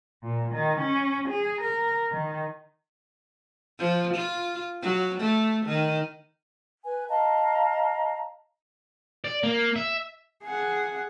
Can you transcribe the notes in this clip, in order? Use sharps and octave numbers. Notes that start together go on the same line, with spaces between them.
A#2
D#3
C#4
G#4
A#4
D#3
F3
F4
F#3
A3
D#3
B4 G#5
D#5 F5 A5 A#5
D5
A#3
E5
G#4 F#5